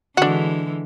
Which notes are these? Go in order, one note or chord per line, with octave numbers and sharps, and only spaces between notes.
D3 E3 G#3 D4 F#4